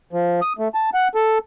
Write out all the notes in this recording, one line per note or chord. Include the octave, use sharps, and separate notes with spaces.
F3
D#6
A3
A5
F#5
A4